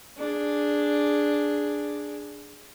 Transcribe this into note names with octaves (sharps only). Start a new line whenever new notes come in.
D4 G#4